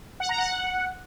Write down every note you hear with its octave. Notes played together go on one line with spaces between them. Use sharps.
F#5
A#5
F#5